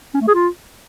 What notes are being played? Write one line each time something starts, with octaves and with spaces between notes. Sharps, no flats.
C#4
A3
G#4
F4